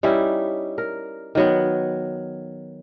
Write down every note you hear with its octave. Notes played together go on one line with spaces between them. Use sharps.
G3 C#4 D#4 E4
A#4
D#3 F#3 B3